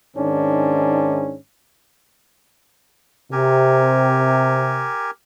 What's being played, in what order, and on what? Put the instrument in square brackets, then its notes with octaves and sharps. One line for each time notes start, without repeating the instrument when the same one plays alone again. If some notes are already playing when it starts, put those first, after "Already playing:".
[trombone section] G#2 D#3 C#4 D4
[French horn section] C3 [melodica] G4 A#4 G#5